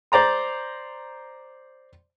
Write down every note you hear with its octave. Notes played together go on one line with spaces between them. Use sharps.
C5 D5 A#5 C6